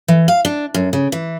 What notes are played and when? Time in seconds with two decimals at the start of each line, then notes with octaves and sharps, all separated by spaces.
0.08 E3
0.28 F5
0.45 D4
0.74 F#2
0.93 C#3
1.12 E3